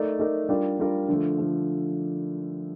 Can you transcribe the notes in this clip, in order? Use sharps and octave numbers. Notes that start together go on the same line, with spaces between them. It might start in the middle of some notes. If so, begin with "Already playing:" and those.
Already playing: A3 D#4 A#4 D5
A3 D#4 A#4 D5
G3 D4 F4 A#4 D5
G3 D4 F4 A#4 D5
D3 F3 A3
D3 F3 A3